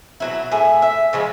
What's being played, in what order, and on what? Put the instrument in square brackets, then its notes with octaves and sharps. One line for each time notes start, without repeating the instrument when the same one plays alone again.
[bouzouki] B2 F#3 E4
A2 G#4 E5
E5
C#3 F3 G#3